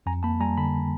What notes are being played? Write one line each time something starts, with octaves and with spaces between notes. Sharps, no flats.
F2 G#5 A#5
A#3 A5 B5
G3 G#5 A#5
D3 A5 B5